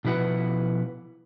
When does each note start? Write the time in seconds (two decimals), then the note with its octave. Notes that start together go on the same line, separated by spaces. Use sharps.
0.05 B2 F3 E4 B4 F#5